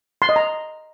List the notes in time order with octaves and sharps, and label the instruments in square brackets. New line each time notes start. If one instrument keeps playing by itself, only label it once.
[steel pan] C6
D#5
A#5